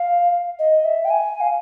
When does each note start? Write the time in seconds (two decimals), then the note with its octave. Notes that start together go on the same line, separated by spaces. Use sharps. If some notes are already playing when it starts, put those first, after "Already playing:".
Already playing: F5
0.59 D#5
0.85 E5
1.05 G5
1.10 G#5
1.41 F5